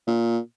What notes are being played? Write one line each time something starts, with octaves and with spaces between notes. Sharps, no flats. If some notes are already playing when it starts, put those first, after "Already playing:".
A#2